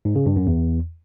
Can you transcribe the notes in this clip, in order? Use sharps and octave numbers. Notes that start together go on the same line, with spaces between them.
G#2
C#3
G2
F#2
E2